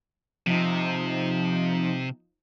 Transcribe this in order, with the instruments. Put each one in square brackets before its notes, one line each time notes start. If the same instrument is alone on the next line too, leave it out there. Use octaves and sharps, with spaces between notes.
[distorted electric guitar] C3 [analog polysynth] F3 D#4